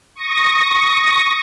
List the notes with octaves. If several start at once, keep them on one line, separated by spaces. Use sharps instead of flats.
C#6 D#6 A#6